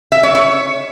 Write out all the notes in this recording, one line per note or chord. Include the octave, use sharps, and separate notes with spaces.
E5
C#5
C#5